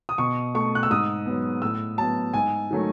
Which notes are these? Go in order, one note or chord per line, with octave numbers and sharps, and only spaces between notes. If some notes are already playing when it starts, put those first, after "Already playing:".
D#6
B2 C#6
A3 C#6
F#6
E6
G#2 D#6
F#3 B3
A2 E6
F#3 B3 A5
G#2 G#5
D#3 F#3 A3